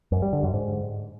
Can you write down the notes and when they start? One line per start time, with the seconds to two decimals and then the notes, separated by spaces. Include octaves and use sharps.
0.12 F#2
0.22 G3
0.33 D3
0.43 F#2
0.54 G#2